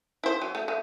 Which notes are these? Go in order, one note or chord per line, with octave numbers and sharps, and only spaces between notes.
E4 C5
F#3
A3
A3